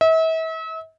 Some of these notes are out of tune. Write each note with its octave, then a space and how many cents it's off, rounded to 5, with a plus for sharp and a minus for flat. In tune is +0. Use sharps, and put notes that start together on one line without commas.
E5 -40